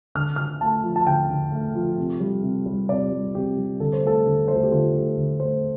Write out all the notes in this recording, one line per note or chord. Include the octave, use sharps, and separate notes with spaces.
D3 F6
D3 F6
A3 A5
F3
A5
D3 G5
D3
A3
F3
C3
G3
C3
G3
C3 D5
G3
C3 G4
G3
D3 A4
C5
A3 A4
D3
A3 C5
A4
G4
D3 F4
A3 G4
D3
A3 C5